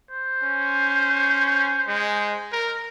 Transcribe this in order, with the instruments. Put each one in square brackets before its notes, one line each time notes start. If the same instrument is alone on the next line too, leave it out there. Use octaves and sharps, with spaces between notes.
[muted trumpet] C5
[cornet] C#4
G#3
A#4